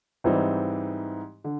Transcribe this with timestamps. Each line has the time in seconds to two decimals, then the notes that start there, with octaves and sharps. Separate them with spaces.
0.24 G#2 E3 G3 C4 D#4
1.44 D3